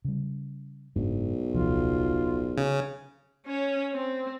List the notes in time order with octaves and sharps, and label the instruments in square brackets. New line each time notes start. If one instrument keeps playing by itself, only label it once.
[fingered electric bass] C#3 G3
[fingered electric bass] F#1 G#2 D4 [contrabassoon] B1
[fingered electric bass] D#1 C2 F3 [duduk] F4
[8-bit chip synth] C#3 [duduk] C#4
[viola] C#4 C#5
C4